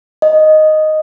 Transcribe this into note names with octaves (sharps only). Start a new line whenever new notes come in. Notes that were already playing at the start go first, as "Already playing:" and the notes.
D#5